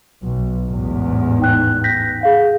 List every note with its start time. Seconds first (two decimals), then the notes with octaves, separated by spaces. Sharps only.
0.23 B1
0.69 A1 E2 G#2
1.39 D#4 G5 F#6
1.84 G6 A#6 B6
2.21 G#4 F5 F#5